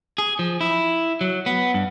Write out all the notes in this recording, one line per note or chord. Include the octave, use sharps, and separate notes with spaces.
G#4
F3
E4
F#3
B3
G2